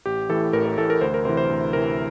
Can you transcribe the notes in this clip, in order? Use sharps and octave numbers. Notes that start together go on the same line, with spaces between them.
A1 G4
A2 E3 A4
A1 A#4
A#4
A2 E3 A4
A#4
D2 C5
A#4
C3 E3 C5
C5
D2
C3 E3 A#4